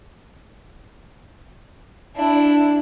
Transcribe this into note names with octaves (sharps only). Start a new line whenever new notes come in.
D4 E4